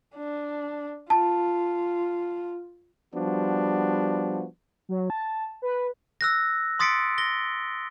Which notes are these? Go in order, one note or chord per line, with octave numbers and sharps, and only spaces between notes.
D4
F4 A5
F3 G3 B3 D4 F#4
F#3
A5
B4
E6 F#6 A#6
C6 D#6 A6 B6 C#7 D7
A#6 G7